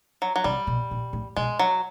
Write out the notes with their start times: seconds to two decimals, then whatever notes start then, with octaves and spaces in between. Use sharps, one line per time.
0.22 F#3
0.36 F#3
0.44 C3 G3
0.67 B2
0.91 A#2
1.13 A2
1.36 B2 G#3
1.59 F#3